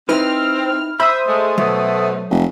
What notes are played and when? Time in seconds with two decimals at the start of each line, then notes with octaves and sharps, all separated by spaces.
0.09 C4 D#4 E4 B4 F6
1.00 C5 E5 B5 D#6
1.27 G#3 A3
1.58 B2 F#3 A3
2.30 F1